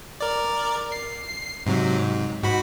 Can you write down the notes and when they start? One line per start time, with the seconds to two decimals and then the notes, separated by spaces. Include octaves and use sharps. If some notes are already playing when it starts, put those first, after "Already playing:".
0.21 A#4 D5
0.92 C7
1.66 G#2 C3 F#3
1.98 G#2
2.43 G#2 F#4 B5